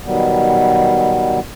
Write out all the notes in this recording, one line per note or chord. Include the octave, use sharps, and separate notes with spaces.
B2 D#3 F#3 G3 B3